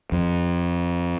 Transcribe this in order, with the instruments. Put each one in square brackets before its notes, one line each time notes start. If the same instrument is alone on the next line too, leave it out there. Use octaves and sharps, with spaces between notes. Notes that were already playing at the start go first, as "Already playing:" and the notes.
[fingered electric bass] F2